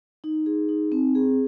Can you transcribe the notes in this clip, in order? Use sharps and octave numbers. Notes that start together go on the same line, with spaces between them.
D#4
G#4
D#4
C4
G#4